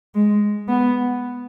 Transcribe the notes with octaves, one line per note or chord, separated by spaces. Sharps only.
G#3
B3